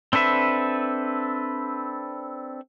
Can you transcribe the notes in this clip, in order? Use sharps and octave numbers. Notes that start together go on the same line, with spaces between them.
C4 D4 A4 B4 E5